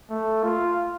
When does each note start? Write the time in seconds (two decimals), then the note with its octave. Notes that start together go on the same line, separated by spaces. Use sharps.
0.10 A3
0.44 F4